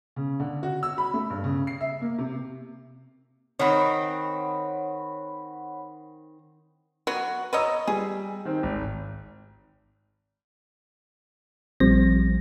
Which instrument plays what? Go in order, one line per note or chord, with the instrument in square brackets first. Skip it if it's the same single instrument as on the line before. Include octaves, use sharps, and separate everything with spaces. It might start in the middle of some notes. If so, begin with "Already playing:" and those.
[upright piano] C#3
D3
F#4
E6
B5
A3
G2
C#3
C7
E5
A#3
C3
[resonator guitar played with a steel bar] D#3 C4 [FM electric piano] C#5 F#5 B5
[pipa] F#3 B3 F#4
[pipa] B4 C#5 D#5 [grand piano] A#5 E6
[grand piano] G3 [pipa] G#4
[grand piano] D#3 C4
G#1
[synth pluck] A#1 F3 G3 C4 A#6